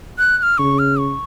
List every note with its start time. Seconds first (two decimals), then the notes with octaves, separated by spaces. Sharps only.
0.18 F#6
0.38 F#6
0.43 F6
0.58 C#3 C#6
0.79 F6
0.99 C#6